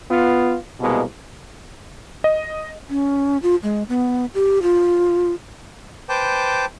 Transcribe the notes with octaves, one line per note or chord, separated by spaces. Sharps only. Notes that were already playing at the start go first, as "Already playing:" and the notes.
B3 F4
C2 B2 G#3 A#3 B3
D#5
C#4
F4
G#3
B3
G4
F4
B4 C5 G5 A5 D6